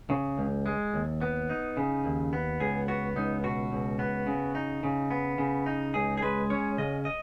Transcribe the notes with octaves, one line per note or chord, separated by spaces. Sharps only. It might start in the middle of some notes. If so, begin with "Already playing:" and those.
C#3
C#2
G#3
D#2
B3
D#4
C#3
D#2
B3
C#2 G#4
B3 F#4
C#2 D#4
B2 F#4
C#2
B3
C#3
D#4
C#3
B3
C#3
D#4
C#2 G#4
G#4
G#3 B4
C#4 C#5
C#3 D#5
D#5